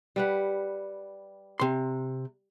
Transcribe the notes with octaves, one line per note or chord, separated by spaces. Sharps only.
G3 B4 F#5
C3 C6